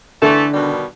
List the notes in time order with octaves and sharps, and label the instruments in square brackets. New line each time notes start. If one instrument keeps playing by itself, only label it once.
[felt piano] D3 [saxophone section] E3 A3
[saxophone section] B2 D#3 G3